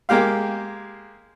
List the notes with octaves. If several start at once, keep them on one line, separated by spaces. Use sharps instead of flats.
G#3 A#3 G4 F5